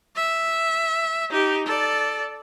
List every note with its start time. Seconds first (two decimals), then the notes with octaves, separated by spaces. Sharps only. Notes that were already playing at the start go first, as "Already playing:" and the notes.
0.16 E5
1.30 D#4 G4
1.66 A4 D5